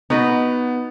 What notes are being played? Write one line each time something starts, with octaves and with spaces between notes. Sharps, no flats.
B3 D#4 F#4 B4